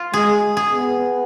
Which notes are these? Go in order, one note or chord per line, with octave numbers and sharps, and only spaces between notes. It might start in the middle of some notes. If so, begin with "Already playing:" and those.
Already playing: F4
G#3 G#4
G#4
B3